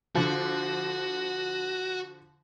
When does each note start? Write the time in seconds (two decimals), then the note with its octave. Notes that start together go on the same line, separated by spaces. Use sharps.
0.15 D3 F3 F#4